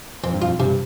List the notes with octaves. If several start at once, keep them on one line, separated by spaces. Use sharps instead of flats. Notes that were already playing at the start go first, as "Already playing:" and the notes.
F2 C4
G2
F2 F4
G2 C3